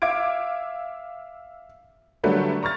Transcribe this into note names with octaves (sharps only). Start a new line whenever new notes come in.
E5 F5 D6 G#6 D7
D3 F#3 G3 A3 D4 B4
A#5 C#6 F6 A6